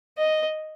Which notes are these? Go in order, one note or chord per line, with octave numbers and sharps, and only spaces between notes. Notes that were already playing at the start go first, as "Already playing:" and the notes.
D#5